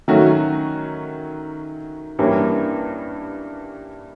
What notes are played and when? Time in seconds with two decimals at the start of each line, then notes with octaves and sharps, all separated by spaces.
0.08 D#3 F#3 A3 C#4 F#4
2.19 G2 E3 G3 A#3 C#4